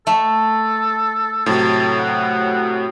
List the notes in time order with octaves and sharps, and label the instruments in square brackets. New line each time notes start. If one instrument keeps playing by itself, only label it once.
[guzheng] A3 [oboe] A4
[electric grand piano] A2 C3 F#3 [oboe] A5
[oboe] F#5